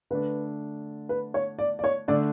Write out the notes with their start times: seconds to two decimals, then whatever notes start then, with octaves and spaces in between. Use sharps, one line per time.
0.10 D3 A3 D4 B4
1.09 B4
1.34 C#5
1.59 D5
1.79 D5
1.84 C#5
2.08 D3 A3 D4 D5